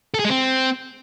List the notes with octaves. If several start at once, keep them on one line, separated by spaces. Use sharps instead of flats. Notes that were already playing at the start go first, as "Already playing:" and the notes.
A4
G#4
G#3
C4